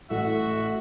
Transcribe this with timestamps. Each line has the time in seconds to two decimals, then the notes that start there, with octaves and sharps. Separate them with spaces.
0.10 A1 E4 F#4 A4 E5 F#5